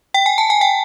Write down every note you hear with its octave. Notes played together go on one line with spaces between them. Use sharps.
G5
G#5
A5
G#5
G5